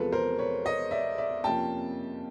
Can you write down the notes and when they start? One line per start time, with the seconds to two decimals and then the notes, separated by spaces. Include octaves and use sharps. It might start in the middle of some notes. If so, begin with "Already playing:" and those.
Already playing: E2 C3 F3 G#3 A4 B4
0.12 A#4 C5
0.39 B4 C#5
0.65 C#5 D#5
0.91 D5 E5
1.18 D5 E5
1.44 F2 C3 F3 A#3 C#4 G5 A5